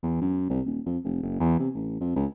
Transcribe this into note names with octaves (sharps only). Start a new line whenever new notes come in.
E2
F#2
C2
D#1
F2
F1
F#1
E2
C3
A1
F2
C#2